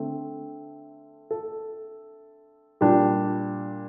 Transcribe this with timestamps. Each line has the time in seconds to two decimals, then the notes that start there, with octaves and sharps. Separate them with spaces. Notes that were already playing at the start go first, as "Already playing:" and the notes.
Already playing: D3 A3 C4
1.31 A4
2.81 A#2 G3 D4 G4